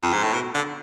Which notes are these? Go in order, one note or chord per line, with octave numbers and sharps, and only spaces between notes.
F2
G#2
A2
B2
D3